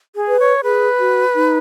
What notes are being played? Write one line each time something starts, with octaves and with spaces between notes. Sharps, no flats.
G#4
B4
C#5
G#4 B4
F#4
D#4